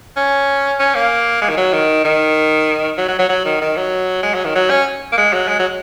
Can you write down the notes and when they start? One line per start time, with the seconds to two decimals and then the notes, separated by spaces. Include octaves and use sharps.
0.16 C#4
0.79 C#4
0.95 A#3
1.41 G#3
1.49 D#3
1.57 F#3
1.73 D#3
2.04 D#3
2.97 F#3
3.08 F#3
3.19 F#3
3.29 F#3
3.45 D#3
3.61 D#3
3.77 F#3
4.23 G#3
4.34 F#3
4.44 D#3
4.55 F#3
4.70 C#4
5.12 A#3
5.17 G#3
5.33 F#3
5.48 G#3
5.59 F#3